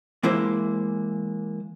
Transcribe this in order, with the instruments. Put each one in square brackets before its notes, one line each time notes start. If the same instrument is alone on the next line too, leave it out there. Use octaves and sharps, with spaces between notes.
[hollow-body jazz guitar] E3 G#3 A#3 E4 C5